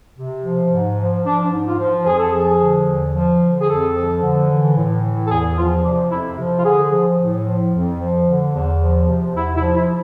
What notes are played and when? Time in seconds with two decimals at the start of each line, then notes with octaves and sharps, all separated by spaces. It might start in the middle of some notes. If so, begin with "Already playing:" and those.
0.17 C3
0.44 F3
0.71 G#2
0.98 F3
1.25 F3 D4
1.52 G#2
1.66 F4
1.79 F3
2.06 F2 G#4
2.19 A4
2.31 F3 G#4
2.60 D3
2.87 E2
3.14 F3
3.41 D3
3.61 G#4
3.68 F2 A4
3.95 F3
4.22 D3
4.49 E3
4.77 A2
5.03 E3
5.25 A4
5.30 E2 G#4
5.57 F3 F4
5.84 C3 D4
6.10 F2 E4
6.38 F3
6.58 F4
6.64 D3 G#4
6.92 F3
7.19 A2
7.46 F3
7.73 F2
8.00 F3
8.26 D3
8.54 E2
8.81 F3
9.08 C3
9.35 E2 E4
9.55 E4
9.62 F3
9.75 E4